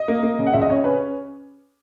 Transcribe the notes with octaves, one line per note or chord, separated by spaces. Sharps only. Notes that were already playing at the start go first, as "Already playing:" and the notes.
Already playing: D#5
A#3
A#3
C#3
F#5
C#2 E5
D#5
C#3 C#5
C#4 B4